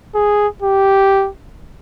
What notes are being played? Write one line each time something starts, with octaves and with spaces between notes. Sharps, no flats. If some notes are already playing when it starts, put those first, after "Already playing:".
G#4
G4